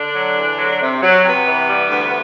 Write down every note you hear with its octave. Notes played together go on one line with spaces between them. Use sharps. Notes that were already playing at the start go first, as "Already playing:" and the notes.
Already playing: D3 D4
F#3
E2
F#3
C3
F#3
C3 B3
E3
G3
D2